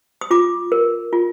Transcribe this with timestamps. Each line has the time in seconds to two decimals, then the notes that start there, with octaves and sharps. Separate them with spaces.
0.21 D#6
0.31 F4 D6
0.72 A#4
1.13 F4